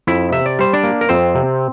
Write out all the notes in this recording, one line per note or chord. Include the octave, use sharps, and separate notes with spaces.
F2 E4 E5
C3 E5
D5
G3 C5
D4 D5
A#3
A#4
F2 C4 C5
C3